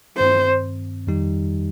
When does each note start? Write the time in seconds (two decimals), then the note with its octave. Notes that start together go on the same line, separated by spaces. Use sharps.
0.17 G2 D#3 C4 C5
1.07 F2 D#3 G3 D#4 G4